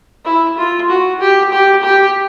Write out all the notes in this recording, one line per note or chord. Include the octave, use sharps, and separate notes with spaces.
E4
F4
F#4
G4
G4
G4